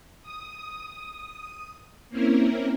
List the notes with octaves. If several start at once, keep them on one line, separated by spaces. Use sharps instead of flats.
D#6
A#3 C4 C#4 E4 A#4